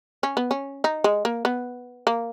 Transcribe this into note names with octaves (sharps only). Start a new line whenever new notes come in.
C#4
B3
C#4
D#4
G#3
A#3
B3
A#3